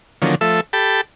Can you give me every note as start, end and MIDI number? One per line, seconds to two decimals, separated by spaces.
0.22 0.35 50
0.22 0.35 51
0.22 0.35 53
0.22 0.35 54
0.22 0.35 58
0.22 0.35 61
0.41 0.61 53
0.41 0.61 57
0.41 0.61 69
0.41 0.61 76
0.41 0.61 88
0.73 1.01 67
0.73 1.01 69
0.73 1.01 79
0.73 1.01 81
0.73 1.01 83